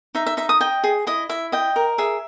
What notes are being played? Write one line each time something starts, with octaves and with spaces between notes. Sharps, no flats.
D#4 E5
E5
D#4 E5
D#6
D#5 G5
G#4
E4 D#5
E4 E5
D#5 G5
A#4
G#4 E5